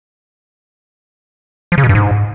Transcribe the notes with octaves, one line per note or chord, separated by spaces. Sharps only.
F3
C#3
B2
G2
G#2